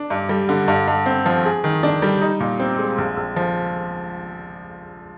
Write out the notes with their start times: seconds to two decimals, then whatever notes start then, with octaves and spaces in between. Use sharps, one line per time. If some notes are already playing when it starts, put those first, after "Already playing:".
Already playing: D4
0.10 G2
0.29 G3
0.49 D3
0.68 G2
0.88 G2
1.06 C4
1.26 F3
1.45 G#4
1.64 D#3
1.83 D4
2.02 G3
2.21 D#4
2.40 A#2
2.60 C4
2.78 G#3
2.98 A#1
3.17 A#1
3.36 F3